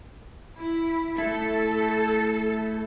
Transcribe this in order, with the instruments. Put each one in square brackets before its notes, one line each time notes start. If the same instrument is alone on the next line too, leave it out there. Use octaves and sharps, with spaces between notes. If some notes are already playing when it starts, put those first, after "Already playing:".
[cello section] E4
[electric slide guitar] A3 E4 [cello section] A4